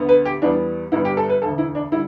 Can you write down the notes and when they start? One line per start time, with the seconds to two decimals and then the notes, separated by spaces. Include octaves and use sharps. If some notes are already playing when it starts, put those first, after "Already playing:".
Already playing: D2 D3 B3
0.09 B4
0.25 G4
0.42 E2 E3 G3 B3 D4
0.92 G1 G2 G3 B3 E4
1.05 G4
1.17 A4
1.29 B4
1.42 E1 D2 D3 A4
1.58 E4
1.75 D4
1.92 D3 G3 E4